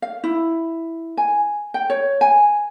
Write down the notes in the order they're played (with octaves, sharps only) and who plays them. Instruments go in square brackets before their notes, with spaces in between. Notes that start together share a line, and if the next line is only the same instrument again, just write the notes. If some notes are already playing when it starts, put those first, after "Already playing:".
[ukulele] F5
E4
G#5
G5
C#5
G#5